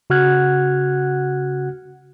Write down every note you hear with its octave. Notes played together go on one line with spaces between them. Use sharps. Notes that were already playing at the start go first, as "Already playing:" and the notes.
C#3 F#4 F#5 F6 F#6 G#6